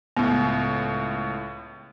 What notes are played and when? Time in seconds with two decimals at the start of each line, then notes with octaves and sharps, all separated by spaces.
0.17 C#2 A2 B3